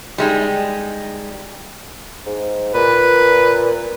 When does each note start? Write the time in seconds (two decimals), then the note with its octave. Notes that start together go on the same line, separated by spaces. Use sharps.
0.18 G3 G#3 D#4
2.26 G#2
2.74 A#2 B4